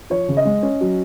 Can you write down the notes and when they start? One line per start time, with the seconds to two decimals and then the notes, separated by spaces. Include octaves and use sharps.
0.10 F3 C#5
0.28 C#3
0.37 D#5
0.45 G#3
0.63 C#4
0.81 F#3